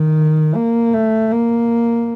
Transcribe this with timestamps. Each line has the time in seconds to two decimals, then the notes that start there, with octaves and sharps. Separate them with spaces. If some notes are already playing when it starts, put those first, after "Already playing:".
Already playing: D#3
0.55 A#3
0.93 A3
1.31 A#3